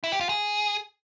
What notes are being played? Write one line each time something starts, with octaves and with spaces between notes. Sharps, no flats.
E4
G4
F4
G#4